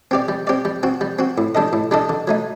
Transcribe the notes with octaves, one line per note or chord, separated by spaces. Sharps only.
C4 G4 D5
G3
C4 G4 D5
G3
C4 F#4
G3
C4 F#4
A2
G3 D4 A4 D#5
A2
G3 D4 A4 D#5
D3
F#3 A3 D#4